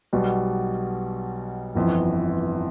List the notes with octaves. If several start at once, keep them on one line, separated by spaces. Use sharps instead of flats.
B1 B2 G3
G1 F2 E3